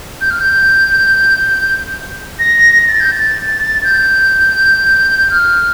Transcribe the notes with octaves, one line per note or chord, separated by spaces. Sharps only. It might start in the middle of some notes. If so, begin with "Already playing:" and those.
G6
F6
G6
A#6
A#6
A6
G6
A6
G6
F6